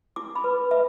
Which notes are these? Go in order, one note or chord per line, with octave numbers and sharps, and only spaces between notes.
E4 D6
B5
B4
B4 E5